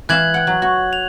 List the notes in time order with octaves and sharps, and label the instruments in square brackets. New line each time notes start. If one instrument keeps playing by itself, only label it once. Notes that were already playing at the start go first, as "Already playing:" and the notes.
[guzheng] E3 E5 F5 [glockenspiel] F#6 G#6 F#7
[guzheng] F#5 G5
F#3
F#4
[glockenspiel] F7